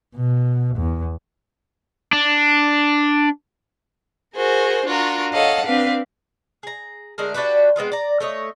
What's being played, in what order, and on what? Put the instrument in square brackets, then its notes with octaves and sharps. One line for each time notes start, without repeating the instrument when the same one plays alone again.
[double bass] B2
E2
[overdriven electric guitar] D4
[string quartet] F#4 G#4 A#4 C5
D4 F4 F#4 A#4
A4 C#5 D#5 F5 F#5 A5
C4 D4 B4 F5
[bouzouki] G#4 A#5
D3 G#3 A3 A#4
D4 F#4 G4 B4
G#3 B3 C4 F4
D5 A#5
A3 C#5 D#5